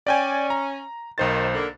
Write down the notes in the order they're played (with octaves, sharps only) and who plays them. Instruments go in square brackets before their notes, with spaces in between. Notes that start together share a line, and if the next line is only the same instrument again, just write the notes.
[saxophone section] C#4 [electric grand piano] D5 G5 G#5
[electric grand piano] A#5
[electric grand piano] B1 C5 A6 [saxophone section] D#3
[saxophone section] D3 A#3